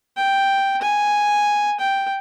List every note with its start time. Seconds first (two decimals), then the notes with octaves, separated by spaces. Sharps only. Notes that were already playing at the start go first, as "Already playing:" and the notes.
0.17 G5
0.82 G#5
1.80 G5